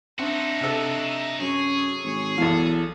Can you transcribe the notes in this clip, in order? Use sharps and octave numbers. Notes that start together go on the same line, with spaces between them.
C4 D4 D#4 F#4 E5
C3 A4
F#2 G#4 C#5
G#1 C#5
B1 E2 A4 F5